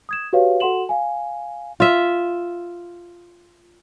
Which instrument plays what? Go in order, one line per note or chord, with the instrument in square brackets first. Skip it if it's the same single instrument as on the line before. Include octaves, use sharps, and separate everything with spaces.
[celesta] D#6 G#6 E7
F#4 G4 B4 C#5 F5
F#4 A4 F#5 C6 E7 F#7
F5 G#5
[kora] F4 E5